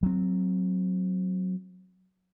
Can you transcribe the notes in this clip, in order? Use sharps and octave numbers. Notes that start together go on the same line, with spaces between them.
F#3 C4